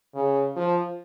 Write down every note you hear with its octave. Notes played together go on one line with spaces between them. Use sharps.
C#3
F3